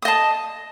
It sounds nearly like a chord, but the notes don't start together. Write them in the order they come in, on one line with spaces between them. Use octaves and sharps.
D#6 D#5 A5